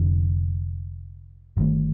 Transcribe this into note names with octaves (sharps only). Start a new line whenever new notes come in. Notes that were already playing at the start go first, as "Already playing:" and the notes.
Already playing: F1 F2 D3
G1 G2 D#3 A3